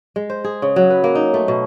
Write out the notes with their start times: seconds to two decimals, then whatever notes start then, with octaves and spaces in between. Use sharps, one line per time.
0.16 G#3
0.30 C5
0.44 G#4
0.62 C#3
0.76 F#3
0.90 B4
1.04 A#3
1.15 D#4
1.34 A3
1.48 B2